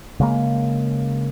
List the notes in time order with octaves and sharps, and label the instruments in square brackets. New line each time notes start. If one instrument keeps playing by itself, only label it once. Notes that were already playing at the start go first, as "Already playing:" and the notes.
[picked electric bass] C#3 G#3 A#3